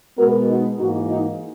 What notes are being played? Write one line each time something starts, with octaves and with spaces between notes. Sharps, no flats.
B2 G#3 B3 F#4 A#4
D#4 F#4
G#2 E3 A#3 D#4 F#4
D#4 F#4